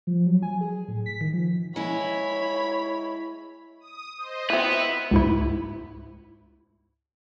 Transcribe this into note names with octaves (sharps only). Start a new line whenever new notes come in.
F3
F#3
G#5
G#4
A2
B6
D#3
F3
G#3 E4 C#5 B5
D#6
C5 D#5
B3 C4 E4 B4 E5
C#2 G#2 E4